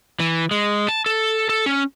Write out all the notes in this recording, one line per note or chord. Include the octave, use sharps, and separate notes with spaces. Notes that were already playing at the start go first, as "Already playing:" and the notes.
E3
G#3
A5
A4
A4
C#4